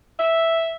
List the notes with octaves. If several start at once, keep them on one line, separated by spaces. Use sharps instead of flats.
E5